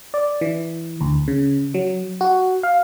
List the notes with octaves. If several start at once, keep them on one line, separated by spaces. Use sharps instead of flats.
D5
E3
D2
C#3
F#3
F#4
F5